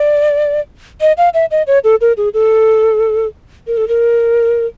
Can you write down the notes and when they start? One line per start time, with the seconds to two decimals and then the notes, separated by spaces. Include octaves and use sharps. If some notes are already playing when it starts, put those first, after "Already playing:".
Already playing: D5
1.01 D#5
1.17 F5
1.34 E5
1.51 D#5
1.67 C#5
1.84 A4
2.01 A#4
2.17 G#4
2.34 A4
3.67 A#4
3.77 A4
3.88 A#4